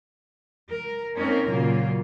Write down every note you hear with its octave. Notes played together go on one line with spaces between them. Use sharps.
A#4
A#3 C4 C#4 D#4 A4 A#4
A#2 C#3 F#3 A#3 F4